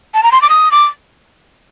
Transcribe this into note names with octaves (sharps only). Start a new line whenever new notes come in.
A5
A#5
C6
D6
D#6
D6